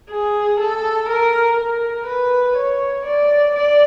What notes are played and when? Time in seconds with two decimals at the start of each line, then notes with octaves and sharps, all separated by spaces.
0.11 G#4
0.60 A4
1.10 A#4
1.58 A#4
2.07 B4
2.57 C#5
3.06 D5
3.55 D5